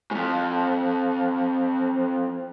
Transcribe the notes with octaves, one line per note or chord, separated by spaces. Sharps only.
F2 G#2